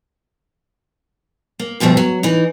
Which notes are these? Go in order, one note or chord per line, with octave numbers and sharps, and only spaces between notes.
A#3
D2 G2 B2 F3 A3
F#3
E3 D#4